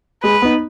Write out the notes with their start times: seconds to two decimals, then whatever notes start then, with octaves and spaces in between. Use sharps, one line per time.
0.23 G#3 B4
0.42 B3 D#4